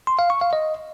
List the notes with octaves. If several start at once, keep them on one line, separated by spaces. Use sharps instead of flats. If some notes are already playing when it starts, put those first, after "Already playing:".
C6
F5
C#6
F5
D#5